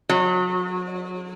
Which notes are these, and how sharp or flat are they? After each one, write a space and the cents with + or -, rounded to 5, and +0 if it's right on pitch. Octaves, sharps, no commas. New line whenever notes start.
F#3 -30